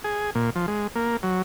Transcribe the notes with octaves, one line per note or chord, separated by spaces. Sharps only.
G#4
A#2
F3
G#3
A#3
F#3